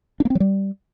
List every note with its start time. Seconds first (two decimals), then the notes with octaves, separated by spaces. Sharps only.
0.20 D4
0.25 A#3
0.30 C4
0.35 F#3
0.40 G3